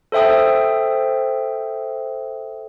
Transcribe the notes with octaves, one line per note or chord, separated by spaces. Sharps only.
A4 C5 E5 G5 D#6